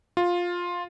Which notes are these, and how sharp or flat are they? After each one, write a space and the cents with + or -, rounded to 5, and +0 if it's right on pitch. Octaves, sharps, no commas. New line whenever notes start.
F4 +10